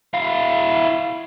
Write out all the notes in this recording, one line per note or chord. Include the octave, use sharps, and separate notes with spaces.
E4 F5